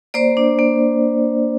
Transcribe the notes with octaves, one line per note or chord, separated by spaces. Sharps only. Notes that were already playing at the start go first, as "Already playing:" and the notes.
A#3 C5 D5
D4
A#3